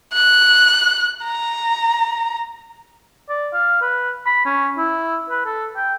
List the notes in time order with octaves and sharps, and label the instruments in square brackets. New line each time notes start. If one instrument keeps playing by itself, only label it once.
[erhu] F#6
A#5
[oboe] D5
F5
B4
B5
C#4
E4
B4
A4
G5